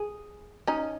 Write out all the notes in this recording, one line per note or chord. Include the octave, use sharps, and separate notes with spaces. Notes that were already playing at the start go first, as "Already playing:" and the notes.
Already playing: G#4
C#4 D#4